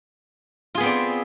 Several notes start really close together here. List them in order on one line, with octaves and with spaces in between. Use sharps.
F4 G#4 B3 C4 D5